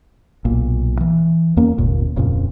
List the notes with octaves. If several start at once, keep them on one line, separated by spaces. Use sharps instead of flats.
B1 A#2
E3
E2 A#3 C#4
G1 D#2 A#2
D1 F2 A#2 C#3